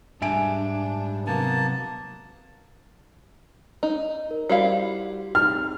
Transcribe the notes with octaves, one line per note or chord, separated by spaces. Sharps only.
G#2 G3 D4 E5 G#5 D7
C3 F#3 A#3 B3 A5
D#4
A#4
G3 E4 F#4 C5 F5 C7
C4 D#4 F6